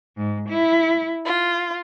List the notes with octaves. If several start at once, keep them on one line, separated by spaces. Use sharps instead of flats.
G#2
E4
F4